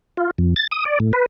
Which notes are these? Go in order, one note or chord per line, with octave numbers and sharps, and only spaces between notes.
F4
F2
A6
D#6
D5
A2
B4